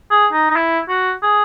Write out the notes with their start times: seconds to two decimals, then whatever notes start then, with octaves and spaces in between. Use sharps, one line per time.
0.11 G#4
0.33 D#4
0.50 D#4
0.56 E4
0.89 F#4
1.23 G#4